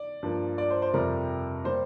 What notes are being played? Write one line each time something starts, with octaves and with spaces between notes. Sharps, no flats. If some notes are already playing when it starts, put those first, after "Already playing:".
Already playing: D5
G2 F3 A#3
D5
C5
C5
F2 C3 G3 A#4
G3 A#3 C5